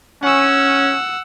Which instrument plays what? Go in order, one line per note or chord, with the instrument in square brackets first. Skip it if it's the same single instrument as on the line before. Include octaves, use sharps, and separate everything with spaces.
[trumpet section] C#4 [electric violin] F#5 E6